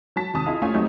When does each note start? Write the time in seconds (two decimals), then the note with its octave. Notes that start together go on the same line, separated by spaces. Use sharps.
0.16 F#3 F#4 A5 B6
0.34 G#1 D#2 C3 A5 D#6
0.46 E4 F4 G#4 D#5 F5
0.62 A3 C#4 F4 G4 G#5
0.74 F#3 G3 A3 C4 D#4 G4